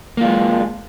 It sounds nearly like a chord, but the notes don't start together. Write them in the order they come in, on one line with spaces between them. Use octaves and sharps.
A#3 F4 G#3